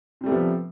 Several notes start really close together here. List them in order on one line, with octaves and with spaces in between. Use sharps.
C3 G3 A3 B3 F3